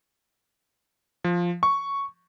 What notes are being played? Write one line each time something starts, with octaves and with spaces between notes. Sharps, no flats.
F3
C#6